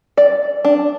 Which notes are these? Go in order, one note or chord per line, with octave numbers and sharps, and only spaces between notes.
D5
D4